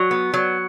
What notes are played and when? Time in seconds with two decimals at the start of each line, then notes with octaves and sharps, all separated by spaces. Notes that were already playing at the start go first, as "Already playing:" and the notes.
Already playing: F#3
0.11 B3
0.34 F#3